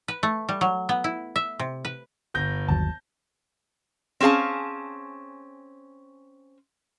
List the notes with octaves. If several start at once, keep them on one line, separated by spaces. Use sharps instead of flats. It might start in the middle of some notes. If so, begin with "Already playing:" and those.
B4
A3
G3
F#3
B3
E4
E5
C3
B4
G1 G6 A#6
G1 D#2 F#3 A5
C4 C#4 G#4 F5 A5